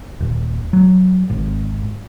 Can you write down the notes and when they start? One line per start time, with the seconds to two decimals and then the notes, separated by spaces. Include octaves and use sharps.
0.20 D#1
0.73 F#3
1.30 G#1